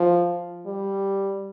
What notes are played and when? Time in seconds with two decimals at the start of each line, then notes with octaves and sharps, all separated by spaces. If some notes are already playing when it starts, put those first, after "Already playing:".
Already playing: F3
0.66 G3